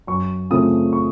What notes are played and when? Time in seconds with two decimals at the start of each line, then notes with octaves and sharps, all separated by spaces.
0.07 F#2 C#6
0.50 C#3 A3 C4 F4 D#6
0.93 C#6